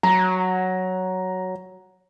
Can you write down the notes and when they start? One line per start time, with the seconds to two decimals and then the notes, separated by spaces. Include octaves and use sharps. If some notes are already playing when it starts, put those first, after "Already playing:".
0.03 F#3 A#5